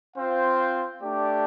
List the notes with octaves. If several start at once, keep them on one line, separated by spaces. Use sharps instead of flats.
C4 F4 C5 F5
A3 D4 G4 D5